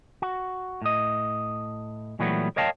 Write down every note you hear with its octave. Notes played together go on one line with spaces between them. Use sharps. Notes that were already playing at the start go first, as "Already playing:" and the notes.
F#4
A2 D#5
A#2 E3 F#3 G3 A3 B3
A#4 C#5 D#5 F5 G5 A5